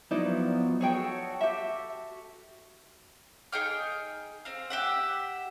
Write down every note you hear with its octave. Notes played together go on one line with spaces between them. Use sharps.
F3 F#3 B3 D#4 E4 D5
F#4 G#4 A4 C#5 G5
G4 E5
D#4 G#4 G5 F6
C4 F5
G4 E5 F#5